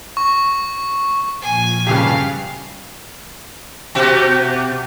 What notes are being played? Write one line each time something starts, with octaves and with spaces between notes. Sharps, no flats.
C#6
A#2 F3 G#5
G2 C#3 G4 F5
B2 F#4 G4